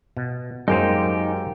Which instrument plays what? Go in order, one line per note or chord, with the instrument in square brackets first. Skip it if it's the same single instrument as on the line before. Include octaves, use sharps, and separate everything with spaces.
[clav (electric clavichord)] B2
[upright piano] F#2 [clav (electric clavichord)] G#3 A#3 C5 [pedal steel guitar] D#4 G4